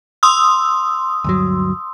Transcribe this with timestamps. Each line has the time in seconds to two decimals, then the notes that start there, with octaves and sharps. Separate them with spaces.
0.23 C6 D#6 E6
1.24 D2 G2 F#3